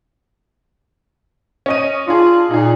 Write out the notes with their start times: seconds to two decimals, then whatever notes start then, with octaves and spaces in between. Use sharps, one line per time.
1.66 C#4 D#5 D#7
2.08 D4 F4 G#4
2.51 A#2 D#4 G#4